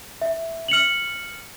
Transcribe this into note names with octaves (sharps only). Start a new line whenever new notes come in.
E5
F6 C#7 F7 F#7